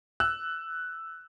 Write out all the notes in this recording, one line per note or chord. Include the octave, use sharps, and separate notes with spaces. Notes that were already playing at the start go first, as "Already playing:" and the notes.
E6 F#6